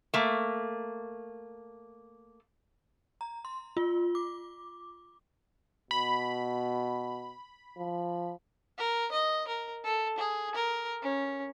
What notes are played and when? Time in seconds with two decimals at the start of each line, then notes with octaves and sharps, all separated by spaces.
0.14 A3 A#3
3.21 A#5
3.45 C6
3.77 F4
4.15 D6
5.91 B2 B5
7.78 F3
8.78 A#4
9.12 D#5
9.47 A#4
9.84 A4
10.18 G#4
10.55 A#4
11.02 C#4